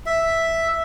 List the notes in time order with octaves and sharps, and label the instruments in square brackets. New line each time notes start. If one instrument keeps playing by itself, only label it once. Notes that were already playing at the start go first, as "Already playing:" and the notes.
[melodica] E5